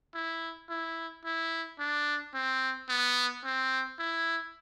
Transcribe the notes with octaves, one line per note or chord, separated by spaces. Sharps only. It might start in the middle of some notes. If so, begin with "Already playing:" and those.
E4
E4
E4
D4
C4
B3
C4
E4